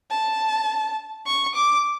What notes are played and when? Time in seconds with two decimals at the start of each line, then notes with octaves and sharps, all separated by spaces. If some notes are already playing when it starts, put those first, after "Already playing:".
0.11 A5
1.27 C#6
1.55 D6